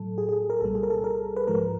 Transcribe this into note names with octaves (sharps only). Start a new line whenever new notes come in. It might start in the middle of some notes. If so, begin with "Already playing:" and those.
Already playing: A2 F#3 A4
G#4
G#4
A#4
C2 A#2 G3 A4
G#4
A#4
A4
A#4
B4
G#2 F3 G#3 A#4